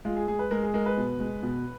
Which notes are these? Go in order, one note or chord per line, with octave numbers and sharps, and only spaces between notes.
G#3 F4
G#4
G#3 G#4
B4
G#3 A#4
G#4
G#3 A#4
B4
B2
G#3
B2